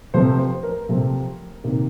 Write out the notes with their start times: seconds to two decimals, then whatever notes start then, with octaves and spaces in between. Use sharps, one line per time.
0.14 C3 F3 A3 C4 C5
0.39 C5
0.63 A#4
0.89 C3 F3 A3 C4
1.64 C3 D#3 A#3